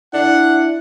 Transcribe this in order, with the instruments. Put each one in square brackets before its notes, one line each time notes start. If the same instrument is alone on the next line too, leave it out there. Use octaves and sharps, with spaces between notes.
[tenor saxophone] D4 [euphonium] E4 [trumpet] F#5